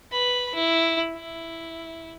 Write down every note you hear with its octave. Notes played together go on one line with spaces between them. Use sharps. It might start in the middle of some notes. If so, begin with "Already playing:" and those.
B4 B5
E4
E4